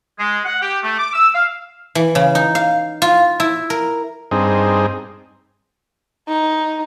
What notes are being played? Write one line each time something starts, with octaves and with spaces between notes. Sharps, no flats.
G#3
F#5
G4
A3
D6
E6
F5
E3
C#3
D#4
F5
F4
E4
A#4
G2 C4 D#4 G#4
D#4